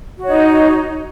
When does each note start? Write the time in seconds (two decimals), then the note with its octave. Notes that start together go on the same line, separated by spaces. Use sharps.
0.18 F#4
0.23 C#5
0.28 D#4